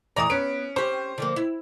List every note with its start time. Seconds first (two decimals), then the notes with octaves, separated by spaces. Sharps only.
0.16 A2 E3 D5 A#5 D#6
0.30 B3 C#4 D7
0.76 C#4 G4 C5
1.18 D3 F3 A#3
1.36 E4